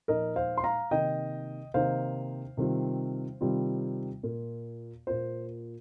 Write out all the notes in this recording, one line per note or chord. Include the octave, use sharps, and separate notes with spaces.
A#2 F3 D#4 A#4 D#5
C5 F5
C6
F5 A#5
C3 D#3 A#3 D#4 D#5 G5
C3 D#3 A#3 D#4 C5 F5
C3 D#3 G3 C4 F4
C3 D#3 G3 C4 F4
A#2 A#3 F4
A#2 A#3 F4 C5